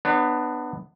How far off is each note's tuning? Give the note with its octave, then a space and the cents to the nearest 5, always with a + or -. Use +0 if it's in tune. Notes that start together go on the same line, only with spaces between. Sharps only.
B3 +5 D4 +35 C#5 +0